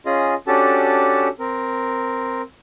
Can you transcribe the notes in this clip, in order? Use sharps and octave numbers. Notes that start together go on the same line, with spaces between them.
C#4 F4 G#4 D#5
C#4 D4 F#4 G4 A4 A5
C4 A#4